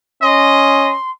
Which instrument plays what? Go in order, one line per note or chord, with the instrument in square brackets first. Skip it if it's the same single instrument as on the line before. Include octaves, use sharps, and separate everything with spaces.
[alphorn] C#4 [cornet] D#5 [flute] C6